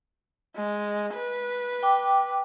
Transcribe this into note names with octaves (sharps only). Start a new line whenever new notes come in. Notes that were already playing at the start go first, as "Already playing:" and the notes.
G#3
B4
G5 D6